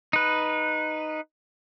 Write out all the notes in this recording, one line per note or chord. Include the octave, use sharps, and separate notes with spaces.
D#4 B4